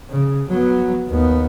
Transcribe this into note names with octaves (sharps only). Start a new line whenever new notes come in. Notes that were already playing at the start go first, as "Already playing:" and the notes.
C#3
F#3 B3
D#2 B3